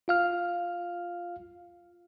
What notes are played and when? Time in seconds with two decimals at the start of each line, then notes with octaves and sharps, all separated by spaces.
0.08 F4 F5 F6